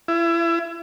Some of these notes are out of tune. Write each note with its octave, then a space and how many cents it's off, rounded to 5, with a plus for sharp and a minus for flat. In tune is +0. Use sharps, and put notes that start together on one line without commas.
E4 +30